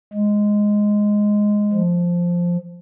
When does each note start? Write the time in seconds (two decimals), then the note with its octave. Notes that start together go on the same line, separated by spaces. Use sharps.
0.13 G#3
1.73 F3